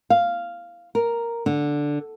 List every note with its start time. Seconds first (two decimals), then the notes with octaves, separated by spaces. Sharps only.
0.10 F5
0.95 A#4
1.46 D3